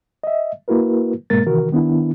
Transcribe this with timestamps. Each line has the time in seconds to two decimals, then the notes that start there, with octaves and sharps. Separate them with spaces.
0.24 D#5 E5
0.68 A#3 E4 F#4 A#4 B4
1.30 G#2 B2 G#3 A#3 A#4 A6
1.47 C3 D#3 E3 F#4 A#4
1.72 D#3 B3 D4 E4